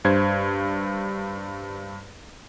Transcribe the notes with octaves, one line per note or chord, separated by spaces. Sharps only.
G2 C5 G#6